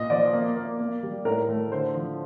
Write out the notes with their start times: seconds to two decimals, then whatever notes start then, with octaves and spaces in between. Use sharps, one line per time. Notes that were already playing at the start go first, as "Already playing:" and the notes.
Already playing: A#2 D#5
0.10 F3 D5
0.33 A#3
0.56 A#3
0.79 A#3
1.03 G3
1.25 A2 A#4
1.49 A3
1.72 D3 C5
1.95 F3